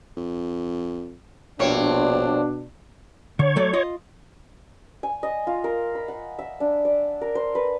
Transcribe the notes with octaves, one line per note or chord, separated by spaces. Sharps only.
F2
A#1 G2 B2 C4 D4 C#5
D3 C#5
F#3 A3 D5
F4 D#5
G#5
D#5
F4
A#4
B5
F#5
E5
D4
D5
A#4
C5
B4